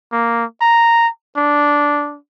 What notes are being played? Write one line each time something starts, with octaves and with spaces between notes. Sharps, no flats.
A#3
A#5
D4